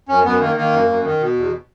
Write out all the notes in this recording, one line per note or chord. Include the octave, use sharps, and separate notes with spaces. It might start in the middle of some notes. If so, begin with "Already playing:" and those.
F#2 C#4
F#2 B3
D#3 A#3
D#3 A#3
F#2
F#2
D#3
B2
E2